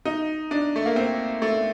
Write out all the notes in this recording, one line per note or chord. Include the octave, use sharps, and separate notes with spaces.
D#4
D4
A3
A#3
C4
A3